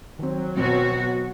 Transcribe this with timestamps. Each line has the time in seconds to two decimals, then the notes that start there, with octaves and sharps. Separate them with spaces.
0.19 D#3 F#3 C4
0.58 B2 B3 C4 F#4